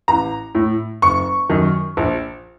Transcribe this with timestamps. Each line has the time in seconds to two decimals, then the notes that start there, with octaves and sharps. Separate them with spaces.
0.08 A1 A#5
0.55 A2
1.02 F#1 C#6
1.50 F#2 D#3
1.97 A#1